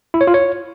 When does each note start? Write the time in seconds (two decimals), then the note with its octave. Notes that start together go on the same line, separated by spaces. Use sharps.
0.14 E4
0.21 C#5
0.27 F4
0.34 C#5